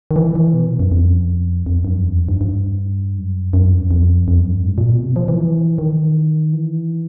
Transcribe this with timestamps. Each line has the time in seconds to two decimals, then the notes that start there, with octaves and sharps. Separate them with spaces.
0.11 D#3
0.16 E3
0.35 E3
0.54 B2
0.79 F#2
0.92 F2
1.66 F2
1.85 F#2
2.04 E2
2.17 F2
2.29 G2
2.41 G2
3.17 F#2
3.53 F#2
3.72 F2
3.91 F2
4.28 F2
4.40 F#2
4.53 G2
4.66 G#2
4.78 A#2
4.91 B2
5.03 C3
5.16 F3
5.28 E3
5.78 D#3
6.53 E3